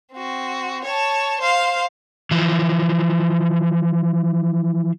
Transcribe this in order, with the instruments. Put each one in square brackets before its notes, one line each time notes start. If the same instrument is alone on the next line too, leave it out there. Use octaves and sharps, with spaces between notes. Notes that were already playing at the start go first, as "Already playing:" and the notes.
[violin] C4 F#4
C#5 A5
C5 F5
[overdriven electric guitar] E3 F3